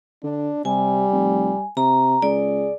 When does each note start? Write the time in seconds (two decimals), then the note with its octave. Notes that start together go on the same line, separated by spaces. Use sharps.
0.24 D3 D4
0.65 C3 G3 G#5
1.12 F1
1.77 C3 A#5
2.22 C#2 G#4 D5